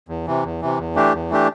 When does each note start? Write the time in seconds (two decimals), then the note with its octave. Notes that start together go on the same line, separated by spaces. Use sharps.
0.09 E2
0.27 C3 E3
0.44 E2
0.61 C3 E3
0.79 E2
0.95 E3 A3 D4 G4
1.14 E2
1.30 E3 A3 D4 G4